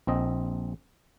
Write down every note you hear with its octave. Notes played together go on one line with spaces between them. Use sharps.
A#1 C4 D#5